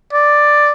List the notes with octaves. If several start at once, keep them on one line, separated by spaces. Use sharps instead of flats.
D5